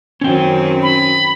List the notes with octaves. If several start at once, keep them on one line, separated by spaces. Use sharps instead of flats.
F#2 D#3 C4 C#4 G5
B5